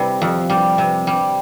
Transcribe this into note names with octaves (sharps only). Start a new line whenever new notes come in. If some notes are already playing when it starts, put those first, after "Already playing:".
Already playing: C3 G3 E4
F2
G3
C3
G3